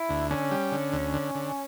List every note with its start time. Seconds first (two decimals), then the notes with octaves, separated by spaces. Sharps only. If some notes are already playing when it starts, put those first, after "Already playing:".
Already playing: E4
0.09 D2
0.30 D3 C#4
0.51 G3
0.72 D3
0.92 D2
1.13 D3
1.35 D3